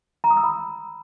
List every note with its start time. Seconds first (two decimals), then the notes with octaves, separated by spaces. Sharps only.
0.24 A#5
0.30 D#6
0.37 E6
0.43 B5